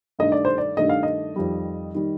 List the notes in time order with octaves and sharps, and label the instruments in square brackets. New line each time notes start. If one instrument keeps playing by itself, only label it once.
[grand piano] G2 D#3 A3 D4 D#5
D5
C5
D5
G2 D#3 A3 D4 D#5
F5
D#5
F2 D#3 G3
D#3 G3